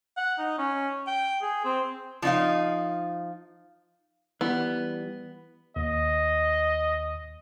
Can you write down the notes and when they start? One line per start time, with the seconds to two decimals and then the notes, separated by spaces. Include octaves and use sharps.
0.17 F#5
0.38 D#4
0.58 C#4
1.07 G5
1.41 G#4
1.65 C4
2.22 F3 D#4 F5
4.41 E3 G3 B3
5.76 D#2 D#5